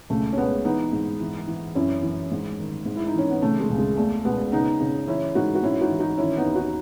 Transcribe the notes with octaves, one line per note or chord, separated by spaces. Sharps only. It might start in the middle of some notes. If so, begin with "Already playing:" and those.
C#2 A3
C#4
B2 G#3 B3
E3 B3 D#4
G#2
E3
E3
F#2 C#4 E4
E3
G#2
D#3
G#2
E4
D#4
E3 C#4
B3
C#3 A3
G#3
C#2
G#3
E2 A3
B2 G#3 B3
C#3 B3 D#4
C#3
E3 C#4 E4
G#2 D#4 F#4
F#4
G#2 C#4 E4
D#4 F#4
E3
D#4 F#4
D#3 C#4 E4
B3 D#4
D#2
D#4 F#4